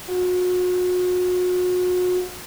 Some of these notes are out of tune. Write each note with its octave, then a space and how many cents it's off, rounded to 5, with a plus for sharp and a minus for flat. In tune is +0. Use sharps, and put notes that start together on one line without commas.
F#4 -35